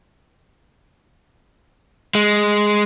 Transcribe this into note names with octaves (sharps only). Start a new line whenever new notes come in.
G#3